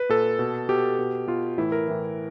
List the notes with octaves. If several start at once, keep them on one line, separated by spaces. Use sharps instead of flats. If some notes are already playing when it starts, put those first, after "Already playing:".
Already playing: B4
A#2 A4
B2
B2 G4
B2
B2 F4
A2 E3 E4
A#4
A2 E3